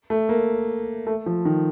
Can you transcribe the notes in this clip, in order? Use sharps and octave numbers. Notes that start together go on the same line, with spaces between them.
A3
A#3
A3
F3
D#3